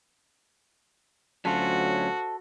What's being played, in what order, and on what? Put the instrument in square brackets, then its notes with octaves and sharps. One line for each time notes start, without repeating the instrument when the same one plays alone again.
[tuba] D2 [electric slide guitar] F#3 C#4 F4 [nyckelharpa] F#4 [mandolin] A4 C5